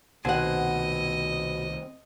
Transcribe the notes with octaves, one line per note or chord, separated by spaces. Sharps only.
C2 B2 D#3 C4 C5 D#5 F#5 G#5